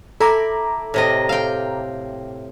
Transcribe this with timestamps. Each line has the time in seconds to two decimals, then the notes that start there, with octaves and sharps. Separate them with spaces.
0.20 E4 A4 A#5 D6
0.94 A2 C3 D#5
1.29 F5 G5